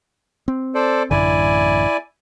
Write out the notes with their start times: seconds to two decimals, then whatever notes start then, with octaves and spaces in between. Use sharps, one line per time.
0.48 C4
0.74 A4 C5 D5
1.11 A1 F#2 D3 E4 D5 G#5